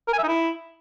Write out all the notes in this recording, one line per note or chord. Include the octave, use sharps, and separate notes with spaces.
A#4
G#5
E5
D#4
E4